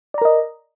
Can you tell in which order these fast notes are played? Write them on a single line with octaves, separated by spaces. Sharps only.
D5 A#5 A#4 D#5